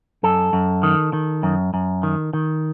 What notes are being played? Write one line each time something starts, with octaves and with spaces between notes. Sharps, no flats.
F#2 A4
F#2
D#3
D#3
F#2
F#2
D#3
D#3